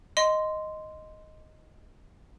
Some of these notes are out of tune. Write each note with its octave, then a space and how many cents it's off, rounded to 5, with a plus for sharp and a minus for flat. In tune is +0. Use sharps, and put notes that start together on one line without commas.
D#5 +0 C6 -10